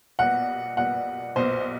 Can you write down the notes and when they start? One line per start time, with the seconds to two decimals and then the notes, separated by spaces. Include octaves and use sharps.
0.19 B1 A#2 G3 B3 F#5
0.77 B1 A#2 G3 B3 F#5
1.36 B1 A#2 G3 B3 C5